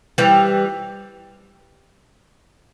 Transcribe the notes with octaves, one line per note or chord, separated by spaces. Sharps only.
E3 G3